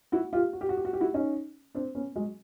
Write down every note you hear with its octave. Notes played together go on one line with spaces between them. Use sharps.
E4 F#4
F4 G4
F#4
G4
F#4
G4
F#4
G4
E4 F#4
C#4 D#4
C4 D4
B3 C#4
F#3 G#3